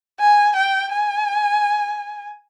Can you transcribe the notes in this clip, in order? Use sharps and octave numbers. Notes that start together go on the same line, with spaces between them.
G#5
G5
G#5